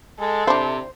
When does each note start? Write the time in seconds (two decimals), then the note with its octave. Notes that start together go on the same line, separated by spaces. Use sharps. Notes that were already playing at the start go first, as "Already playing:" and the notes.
0.19 G#3 A4
0.47 C3 D4 E4 C5